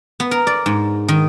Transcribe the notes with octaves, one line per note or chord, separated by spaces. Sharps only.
B3
A#4
D5
G#2
D#3